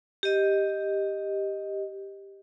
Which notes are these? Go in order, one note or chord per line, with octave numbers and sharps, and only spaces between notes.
G4 D#5